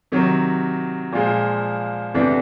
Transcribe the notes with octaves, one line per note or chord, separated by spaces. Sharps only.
C3 D#3 F#3
A#2 F3 G#3
E2 C3 E3 A3 D4